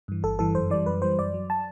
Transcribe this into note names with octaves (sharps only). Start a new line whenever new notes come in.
G2 E3
G1 A4
G2 E3 A4
F#2 C5
E3 G3 D5
F#2 B4
E3 G3 C5
F#2 D5
F#3
A5